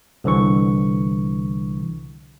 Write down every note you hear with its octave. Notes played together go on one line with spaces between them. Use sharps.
C2 D3 E3 C#6